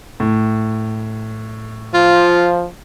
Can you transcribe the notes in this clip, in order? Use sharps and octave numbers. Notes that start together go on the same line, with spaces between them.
A2
F3 F4